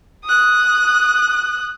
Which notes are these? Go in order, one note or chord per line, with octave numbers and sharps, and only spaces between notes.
D#6 F#6